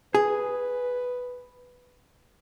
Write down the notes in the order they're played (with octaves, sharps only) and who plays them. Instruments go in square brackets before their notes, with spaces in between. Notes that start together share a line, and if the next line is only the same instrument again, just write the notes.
[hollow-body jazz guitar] G#4 [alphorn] B4